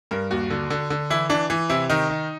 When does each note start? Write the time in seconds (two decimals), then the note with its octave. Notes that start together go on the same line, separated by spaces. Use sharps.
0.11 G2 A#4
0.31 D#2 F#4
0.50 D3
0.70 D3
0.90 D3
1.10 E3 E4
1.29 E3 D4
1.50 E3
1.70 C3 E4
1.90 D#3 D#4
2.10 D#3